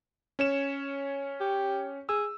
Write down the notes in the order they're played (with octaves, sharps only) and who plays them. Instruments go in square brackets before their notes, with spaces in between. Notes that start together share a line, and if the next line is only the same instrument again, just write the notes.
[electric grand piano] C#4 C#5 E7
[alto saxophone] G4
[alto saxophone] G#4 [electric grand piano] E6